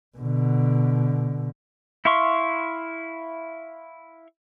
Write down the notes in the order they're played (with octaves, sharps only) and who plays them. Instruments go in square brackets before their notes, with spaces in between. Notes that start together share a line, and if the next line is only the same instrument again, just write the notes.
[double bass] B2 D3
[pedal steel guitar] E4 E5 F5 C6 C#6